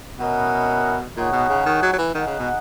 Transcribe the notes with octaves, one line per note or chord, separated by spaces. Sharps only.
B2 C#4 E4 A#4 D#5 F#5
A#2 D#4 G#4 C#5 F#5
B2
C#3
D#3
F#3
F#3
E3
D#3 D#4 G#4 D#5 F#5
C#3
B2